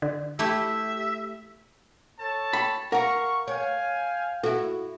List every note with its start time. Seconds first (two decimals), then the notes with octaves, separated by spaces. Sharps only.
0.02 D3
0.39 A3 E4 G4 E5
2.19 A4 C#5 A5
2.53 G5 B5
2.92 A#4 F5 F#5 A#5 C#6
3.48 C#5 F5 G5 G#5
4.43 E4 F#4 A4